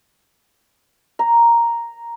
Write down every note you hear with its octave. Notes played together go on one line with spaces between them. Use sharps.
A#5